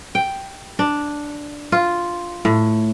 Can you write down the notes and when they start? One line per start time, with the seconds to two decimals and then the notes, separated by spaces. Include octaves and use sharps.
0.15 G5
0.79 D4
1.72 F4
2.45 A2